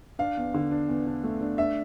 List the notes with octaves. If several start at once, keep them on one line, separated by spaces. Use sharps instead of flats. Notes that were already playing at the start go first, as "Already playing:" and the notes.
D4 F5
E2
D3
D4
E2
D4
A3
D4
D4 E5